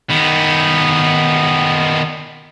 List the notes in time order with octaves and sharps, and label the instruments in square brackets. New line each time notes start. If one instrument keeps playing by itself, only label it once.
[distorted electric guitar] D#3 B3